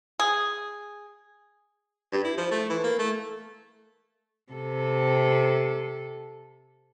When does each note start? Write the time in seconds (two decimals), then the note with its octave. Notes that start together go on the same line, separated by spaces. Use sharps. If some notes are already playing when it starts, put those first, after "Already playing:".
0.19 G#4
2.12 G2
2.24 E4
2.37 F3
2.51 A3
2.69 E3
2.84 A#3
2.99 A3
4.52 C3 A4